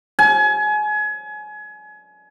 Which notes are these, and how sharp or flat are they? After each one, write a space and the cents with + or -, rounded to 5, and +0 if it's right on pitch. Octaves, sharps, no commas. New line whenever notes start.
G#5 +30